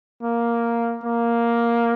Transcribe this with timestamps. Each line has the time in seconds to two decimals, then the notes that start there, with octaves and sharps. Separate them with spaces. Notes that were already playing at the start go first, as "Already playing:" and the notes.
0.23 A#3
1.04 A#3